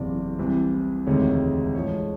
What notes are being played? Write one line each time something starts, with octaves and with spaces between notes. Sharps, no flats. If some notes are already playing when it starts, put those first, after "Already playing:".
Already playing: F#1 E2 C3 D5
C2 C3 E3
E1 D2 C3 D#3 G#3 C#5
A1 G#2 F3 G#3 C#5